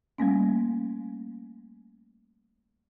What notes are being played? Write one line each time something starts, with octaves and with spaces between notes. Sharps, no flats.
G3 A3 A#3 C#4